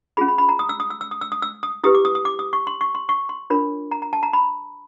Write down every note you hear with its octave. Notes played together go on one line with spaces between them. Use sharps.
C#4 F4 G#4 B5
B5
B5
A#5
D#6
E6
D#6
E6
E6
D#6
E6
D#6
E6
D#6
E4 G4 B4 D#6
D6
D#6
D#6
D6
D#6
C#6
C6
C#6
C6
C#6
C6
D4 F4 A#4 C#5 B5
A#5
A#5
A5
A#5
B5